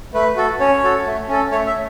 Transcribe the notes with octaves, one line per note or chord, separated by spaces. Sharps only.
A3 B4
F#4 A4
C#4 C#5
F#4 A4
A3
C#4 A4
A3 C#5
E5